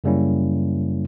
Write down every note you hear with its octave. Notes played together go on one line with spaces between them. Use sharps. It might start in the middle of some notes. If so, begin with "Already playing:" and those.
F#2 C#3 G3 A#3 C#4 E4